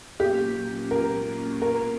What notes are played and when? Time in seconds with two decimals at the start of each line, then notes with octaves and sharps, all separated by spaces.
0.20 A#2 F#3 A#3 C#4 F4 G4
0.91 A#4
1.62 A#4